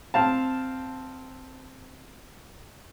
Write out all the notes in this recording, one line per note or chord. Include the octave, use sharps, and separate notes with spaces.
C4 F5 A5